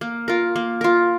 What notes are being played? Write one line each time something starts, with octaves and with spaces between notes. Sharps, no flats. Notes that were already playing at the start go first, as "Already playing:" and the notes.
A#3
F4 A#4
A#3
F4 A#4